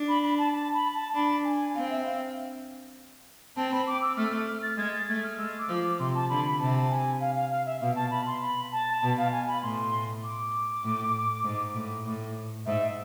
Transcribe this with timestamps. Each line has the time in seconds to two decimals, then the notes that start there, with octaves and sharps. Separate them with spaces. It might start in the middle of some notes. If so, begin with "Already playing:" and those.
Already playing: D4
0.08 B5
0.23 B5
0.38 A5
0.54 A5
0.74 B5
0.94 A5
1.14 D4 B5
1.44 G#5
1.75 C4 F5
1.90 E5
2.05 F5
3.56 C4 A5
3.72 B5
3.87 D6
4.02 E6
4.17 A3 F6
4.47 F6
4.62 A6
4.77 G#3 G#6
4.93 A6
5.08 A3 G#6
5.24 F6
5.38 G#3 E6
5.59 D6
5.68 F3
5.79 D6
5.99 C3 C6
6.15 A5
6.29 D3 B5
6.45 B5
6.59 C3 A5
6.90 G#5
7.20 F5
7.35 F5
7.50 F5
7.66 E5
7.81 B2 F5
7.96 A5
8.11 B5
8.26 C6
8.41 B5
8.72 A5
9.02 B2 A5
9.17 F5
9.32 G#5
9.48 B5
9.63 A2 C6
10.23 D6
10.84 A2
11.44 G#2
11.74 A2
12.06 A2
12.66 G#2 E5